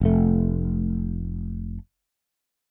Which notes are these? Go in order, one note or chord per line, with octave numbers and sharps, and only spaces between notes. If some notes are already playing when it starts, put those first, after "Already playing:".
F1 A3